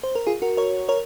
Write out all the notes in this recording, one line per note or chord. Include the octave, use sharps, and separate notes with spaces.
C5
A#4
F4 G#4
F#4 A#4
A#4 C#5
A#4 C#5